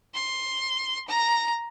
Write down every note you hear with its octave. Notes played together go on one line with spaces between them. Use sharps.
C6
A#5